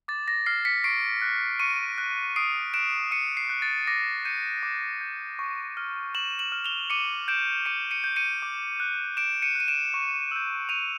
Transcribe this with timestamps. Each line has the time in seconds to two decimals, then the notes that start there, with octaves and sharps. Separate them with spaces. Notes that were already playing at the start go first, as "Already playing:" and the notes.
0.08 D6 A6
0.28 A#6
0.46 F6 C7
0.65 B6 C#7
0.84 C#6 C7 D7
1.22 F#6
1.60 C#6 C#7 D#7
1.98 F#6
2.36 D#6 C7 D7
2.74 F#6 D7 E7
3.11 D#6 C#7 D#7
3.37 C7
3.49 F#6
3.62 A6
3.87 D6 A#6
4.25 G6 C#7 D#7
4.63 D6
5.01 G6
5.39 C#6
5.77 F6
6.15 C#6 E7 F#7
6.39 E7 F#7
6.52 F6
6.64 F7 G7
6.90 D6 C#7 D#7
7.28 G6 D7 E7
7.66 D6 C#7 D#7
7.91 C#7 D#7
8.04 G6
8.16 C#7 D#7
8.42 D6
8.80 F#6
9.17 D6 D7 E7
9.42 C#7 D#7
9.55 F#6 D#7
9.68 D7 E7
9.94 C#6
10.31 E6 G6
10.69 C#6 D#7 F7